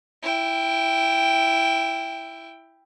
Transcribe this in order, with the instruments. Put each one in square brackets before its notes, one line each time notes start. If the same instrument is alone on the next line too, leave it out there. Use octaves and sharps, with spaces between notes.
[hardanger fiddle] E4 G5